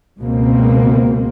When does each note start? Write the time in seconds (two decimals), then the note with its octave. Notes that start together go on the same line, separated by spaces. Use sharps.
0.20 C#2 B2 A#3 C4